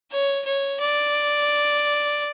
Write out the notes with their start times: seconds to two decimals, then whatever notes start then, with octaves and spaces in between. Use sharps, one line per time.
0.11 C#5
0.45 C#5
0.80 D5